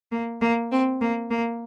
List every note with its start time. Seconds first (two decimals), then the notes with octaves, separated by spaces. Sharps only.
0.11 A#3
0.41 A#3
0.71 C4
1.01 A#3
1.30 A#3